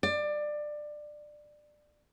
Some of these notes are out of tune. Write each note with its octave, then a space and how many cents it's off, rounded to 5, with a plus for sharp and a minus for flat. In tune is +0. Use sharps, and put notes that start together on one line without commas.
D5 +20